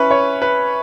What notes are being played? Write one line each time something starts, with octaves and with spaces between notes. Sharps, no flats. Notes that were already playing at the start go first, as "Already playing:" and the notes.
Already playing: C#4 E4 B4 C#5
C#5
B4